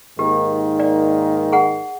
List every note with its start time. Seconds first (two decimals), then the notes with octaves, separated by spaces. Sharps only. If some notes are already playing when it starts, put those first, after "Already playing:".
0.19 G#2 D#3 A#3 G4
0.80 D5
1.53 G#4 F#5